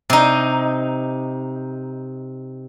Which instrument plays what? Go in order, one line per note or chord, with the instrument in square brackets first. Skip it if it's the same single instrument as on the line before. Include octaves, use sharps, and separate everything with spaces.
[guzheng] C3 D#4